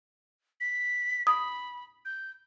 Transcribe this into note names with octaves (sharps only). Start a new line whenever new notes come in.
B6
B5 D#6
G6